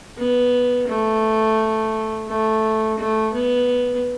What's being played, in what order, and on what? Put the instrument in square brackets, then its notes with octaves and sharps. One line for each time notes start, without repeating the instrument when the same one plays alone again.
[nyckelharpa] B3
A3
A3
A3
B3